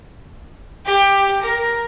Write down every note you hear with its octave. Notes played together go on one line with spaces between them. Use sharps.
G4
A#4